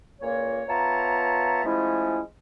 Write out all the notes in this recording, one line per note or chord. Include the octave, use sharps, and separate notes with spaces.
C#2 A#2 A#3 C#5
B3 F4 C#5 E5 A5 A#5
F3 G#3 A3 C#4 E4